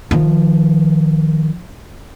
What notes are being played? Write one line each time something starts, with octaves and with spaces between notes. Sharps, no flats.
D#3 F3